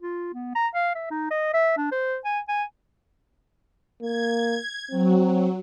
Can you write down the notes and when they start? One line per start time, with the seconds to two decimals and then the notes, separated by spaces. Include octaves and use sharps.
0.02 F4
0.34 B3
0.55 A#5
0.75 F5
0.95 E5
1.11 D#4
1.31 D#5
1.54 E5
1.77 D4
1.92 C5
2.25 G#5
2.48 G#5
4.02 A#3 G#6
4.91 F#3 C4